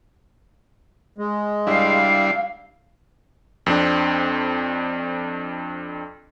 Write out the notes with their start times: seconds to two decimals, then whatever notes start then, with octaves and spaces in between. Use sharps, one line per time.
1.18 G#3
1.67 G3 D4 E4 F5
3.66 F2 C4 D4